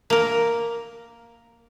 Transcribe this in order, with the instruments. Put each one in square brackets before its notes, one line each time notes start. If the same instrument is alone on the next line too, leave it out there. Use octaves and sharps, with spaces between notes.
[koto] A#3 A#4